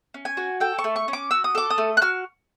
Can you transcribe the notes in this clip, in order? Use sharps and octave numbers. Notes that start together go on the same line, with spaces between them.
C#4
G#5
F#4
A4 G5
C#6
A3
C#6
C#4
D6
F#4 E6
D#6
A4 D6
D#6
A3
F#6
F#4 F6